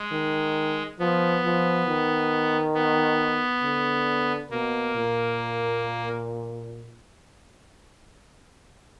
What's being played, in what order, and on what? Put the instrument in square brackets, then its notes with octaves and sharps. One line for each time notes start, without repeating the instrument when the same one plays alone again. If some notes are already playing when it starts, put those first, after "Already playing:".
Already playing: [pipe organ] G#3
[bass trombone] D#3
[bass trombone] F3 [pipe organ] B3
[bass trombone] F3
D#3
[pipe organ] B3
[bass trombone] D3
[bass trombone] B2 [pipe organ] A#3
[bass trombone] A#2